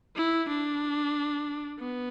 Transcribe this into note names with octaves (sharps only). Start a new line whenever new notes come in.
E4
D4
B3